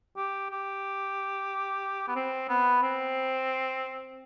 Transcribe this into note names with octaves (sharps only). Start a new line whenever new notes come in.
G4
G4
B3
C4
B3
C4